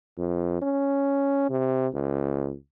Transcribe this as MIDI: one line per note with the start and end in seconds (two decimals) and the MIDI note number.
0.18 0.61 41
0.62 1.45 61
1.50 1.87 48
1.94 2.54 37